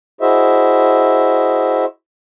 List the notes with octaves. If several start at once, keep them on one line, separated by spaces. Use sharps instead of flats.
E4 F#4 G#4 C5 D#5 E5